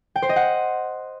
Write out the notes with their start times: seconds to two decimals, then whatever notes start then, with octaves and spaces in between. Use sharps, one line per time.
0.16 G5
0.22 C5
0.29 D#5
0.36 F#5